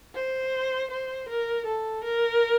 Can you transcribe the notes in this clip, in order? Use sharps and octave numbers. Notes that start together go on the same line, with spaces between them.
C5
C5
A#4
A4
A#4